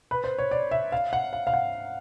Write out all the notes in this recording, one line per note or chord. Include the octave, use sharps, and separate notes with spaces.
B4
C5
C#5
D5
E5
F5
F#5
F5
F5
F#5